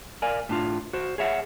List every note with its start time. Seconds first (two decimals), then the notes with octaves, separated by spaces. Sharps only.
0.22 A#4 D5 F5 G#5
0.49 A2 D4 F4
0.93 F#4 C5
1.18 G#4 C#5 E5 F#5